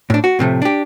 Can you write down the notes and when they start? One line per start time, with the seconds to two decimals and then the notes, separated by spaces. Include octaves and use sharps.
0.10 A2 D4
0.24 F#4
0.39 A2 C3 F3 A3
0.62 D4 G4